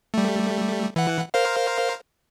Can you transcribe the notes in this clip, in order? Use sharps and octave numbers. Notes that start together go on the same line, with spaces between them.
G3 A3
E3 F#5
A#4 C5 F5